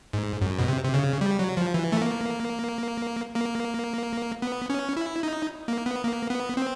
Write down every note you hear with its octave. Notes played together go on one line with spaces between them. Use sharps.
G#2
F#2
B2
C3
C3
C#3
G3
F#3
F3
E3
A3
A#3
A#3
B3
C#4
E4
D#4
A#3
B3
A#3
B3
C4